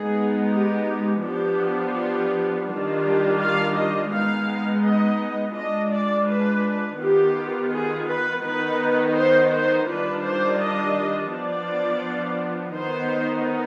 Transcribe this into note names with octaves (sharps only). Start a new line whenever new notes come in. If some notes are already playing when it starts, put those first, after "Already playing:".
Already playing: G#3 B3 D#4 G#4
G4
F3 B3 D4 F4 G4
G4
D#3 G3 D4 F4
G4
F5
D#5
G#3 B3 D#4 F5
D#5
G#3 D4 F4 D#5
D5
B4
D#3 B3 F4 G4
G#4
B4
D#3 B3 D#4 B4
C5
C5
D#3 G3 D4 F4 B4
C5
D#5
F3 B3 D4 F4 D5
D#3 B3 D#4 C5